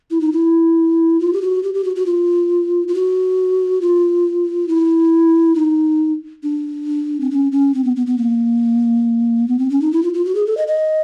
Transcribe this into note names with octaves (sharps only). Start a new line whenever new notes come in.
E4
D#4
E4
F4
G4
F#4
G4
G4
F#4
F#4
F4
F4
F#4
F4
E4
D#4
D4
C4
C#4
C#4
C4
B3
B3
B3
A#3
B3
C4
C#4
D#4
E4
F4
F4
F#4
G#4
A4
D#5
D#5